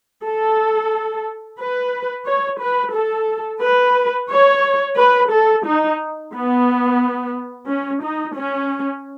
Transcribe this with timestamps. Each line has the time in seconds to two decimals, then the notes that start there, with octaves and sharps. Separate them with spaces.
0.23 A4
1.59 B4
2.26 C#5
2.60 B4
2.94 A4
3.62 B4
4.30 C#5
4.97 B4
5.31 A4
5.65 D#4
6.33 B3
7.68 C#4
8.03 D#4
8.36 C#4